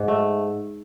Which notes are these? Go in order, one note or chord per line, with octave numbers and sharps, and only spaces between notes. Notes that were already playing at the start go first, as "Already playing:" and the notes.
Already playing: G#2
A3